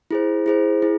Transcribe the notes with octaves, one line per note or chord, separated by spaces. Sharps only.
E4 G#4 C5
E4 G#4 C5
E4 G#4